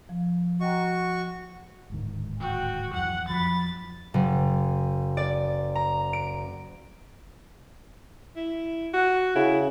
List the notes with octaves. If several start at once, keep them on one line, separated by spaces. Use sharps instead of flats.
F3
F#4 D#5 G5 A#5 C#6
D1 G#2 D#3
F#4 G5
F2 E3 F#3 F#5
F2 F3 F#3 B5 A6
F#1
D5
A#5
D7
E4
F#4
C#3 E4